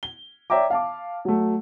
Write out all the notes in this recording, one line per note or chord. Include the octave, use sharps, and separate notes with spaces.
G7
C#5 D5 E5 G5 A#5 D6
F5 A5 D6
F#3 A3